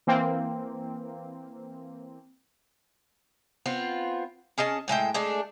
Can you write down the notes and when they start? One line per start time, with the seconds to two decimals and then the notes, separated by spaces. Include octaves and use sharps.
0.07 E3 A#3 C4
3.66 B3 C4 F4
4.58 C#4 G#4 D#5 A5
4.88 A2 G#3 E5 G5
5.14 G#3 A3 D4